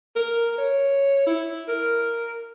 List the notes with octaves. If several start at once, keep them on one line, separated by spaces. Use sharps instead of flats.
A#4
C#5
E4
A#4